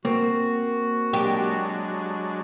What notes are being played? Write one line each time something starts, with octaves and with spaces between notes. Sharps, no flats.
A#3 C4 F#4
F#3 G#3 D4 G4